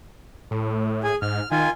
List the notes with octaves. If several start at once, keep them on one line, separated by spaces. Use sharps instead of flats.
A2
G#4 G#5
G#2 F6
D#3 F4 G#5